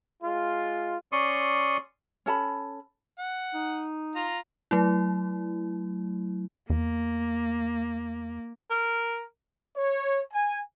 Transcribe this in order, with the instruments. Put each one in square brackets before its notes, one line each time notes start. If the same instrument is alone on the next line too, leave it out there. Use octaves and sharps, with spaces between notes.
[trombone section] G#3 F4
[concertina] C#4 D5 C6 C#6 D#6
[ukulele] C#4 A4 A5 B5
[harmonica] F#5
[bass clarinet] D#4
[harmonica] F4 A#5
[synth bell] F#3 A3 E4
[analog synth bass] E2 [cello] A#3
[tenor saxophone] A#4
[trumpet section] C#5
G#5